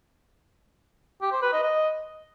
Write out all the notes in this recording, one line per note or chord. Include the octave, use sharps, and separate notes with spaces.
G4
C5
B4
D#5
D#5